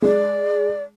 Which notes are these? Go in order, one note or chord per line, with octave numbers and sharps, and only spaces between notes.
G#3 D5